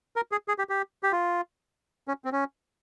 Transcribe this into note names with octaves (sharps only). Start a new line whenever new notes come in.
A#4
G#4
G#4
G4
G4
G4
F4
C#4
C4
C#4